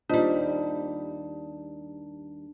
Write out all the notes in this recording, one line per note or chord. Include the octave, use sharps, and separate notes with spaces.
D#2 G3 D4 F4 C5 D#5